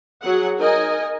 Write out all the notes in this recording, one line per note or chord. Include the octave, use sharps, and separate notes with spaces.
F#3 G#4 F#5
D#4 A#4 D#5 G#5